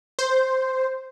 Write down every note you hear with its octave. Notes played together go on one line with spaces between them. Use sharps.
C5